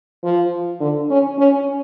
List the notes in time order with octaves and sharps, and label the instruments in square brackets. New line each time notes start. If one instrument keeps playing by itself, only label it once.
[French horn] F3
D3
C#4
C#4